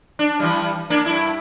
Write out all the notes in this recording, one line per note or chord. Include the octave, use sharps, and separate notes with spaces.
D4
E3 G3
A#3 D4
G2 E4